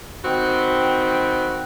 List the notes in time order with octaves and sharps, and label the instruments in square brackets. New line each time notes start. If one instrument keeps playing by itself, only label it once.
[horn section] D#3 C4 F#4 G5 B5